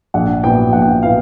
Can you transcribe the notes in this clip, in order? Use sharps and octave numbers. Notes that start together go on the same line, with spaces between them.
A#1 F#5
A#2 F#3 B3 E4 G5
A#1 F#5
G5
F#5
A#2 F#3 B3 E4 F5